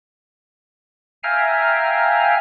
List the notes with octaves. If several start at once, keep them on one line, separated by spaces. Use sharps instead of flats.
E5 F5 G5 G#5 A#5 F6